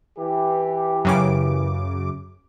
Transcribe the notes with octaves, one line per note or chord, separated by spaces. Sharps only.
E3 G4
F#2 C#3 D6